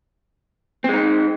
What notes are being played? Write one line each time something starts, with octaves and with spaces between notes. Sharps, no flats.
G#3 C4 D#4